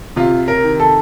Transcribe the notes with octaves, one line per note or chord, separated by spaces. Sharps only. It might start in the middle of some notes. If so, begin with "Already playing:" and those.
C3 F4
A#4
D#3
A4